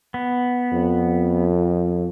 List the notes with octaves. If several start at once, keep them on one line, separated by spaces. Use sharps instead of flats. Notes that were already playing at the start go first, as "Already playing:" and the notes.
B3
F2